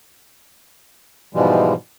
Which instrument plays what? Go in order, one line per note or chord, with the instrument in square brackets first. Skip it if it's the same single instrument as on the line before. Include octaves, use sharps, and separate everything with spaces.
[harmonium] G#2 B2 E3 F3 G3 G#3